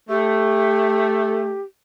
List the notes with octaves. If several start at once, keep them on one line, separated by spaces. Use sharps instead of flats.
A3 G4